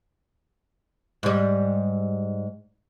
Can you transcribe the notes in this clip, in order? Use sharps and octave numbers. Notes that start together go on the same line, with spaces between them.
G#2 G3